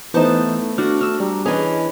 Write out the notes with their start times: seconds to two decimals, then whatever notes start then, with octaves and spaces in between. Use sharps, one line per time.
0.14 E3 A3 B3 D#4 C5 A5
0.78 D4 F#4 F6
1.01 D4 E6 F6
1.20 G3 A#5
1.46 E3 C#4 G#4 D#5 G#5